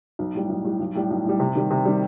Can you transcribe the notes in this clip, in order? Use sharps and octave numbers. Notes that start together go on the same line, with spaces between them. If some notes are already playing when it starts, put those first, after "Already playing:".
B1
A2 G3
B1
A2 G3
B1
A2 G3
B1
A2 G3
C3
D#3 G3
C3
D#3 G3